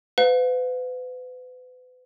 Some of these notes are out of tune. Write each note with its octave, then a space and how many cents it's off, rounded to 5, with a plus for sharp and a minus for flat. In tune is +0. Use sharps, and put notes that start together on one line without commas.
B4 +35 F5 +35